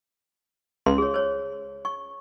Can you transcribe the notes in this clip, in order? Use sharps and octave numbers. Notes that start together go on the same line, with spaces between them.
C#2 C6
G#4 C#5
C5 C#5
C#6